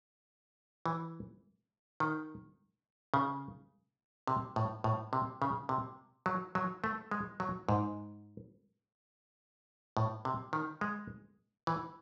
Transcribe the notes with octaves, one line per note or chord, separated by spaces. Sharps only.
E3
D#3
C#3
C3
A2
A2
C3
C#3
C3
F#3
F#3
A3
G#3
F#3
G#2
A2
C3
D#3
G#3
E3